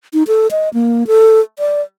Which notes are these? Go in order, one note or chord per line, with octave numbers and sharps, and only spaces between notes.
D#4
A4
D#5
A#3
A4
D5